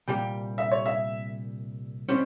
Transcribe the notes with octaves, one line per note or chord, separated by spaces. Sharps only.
C2 A#2 G3 G5
E5
C#5
E5
C3 G3 C#4 C5